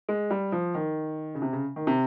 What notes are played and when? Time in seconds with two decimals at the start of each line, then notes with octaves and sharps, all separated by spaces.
0.09 G#3
0.31 G3
0.52 F3
0.75 D#3
1.35 C#3
1.42 C3
1.53 C#3
1.76 D#3
1.87 C3